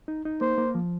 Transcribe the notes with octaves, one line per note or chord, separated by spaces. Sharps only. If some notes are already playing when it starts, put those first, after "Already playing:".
D#4
D#4
A#3 C5
A#3
F3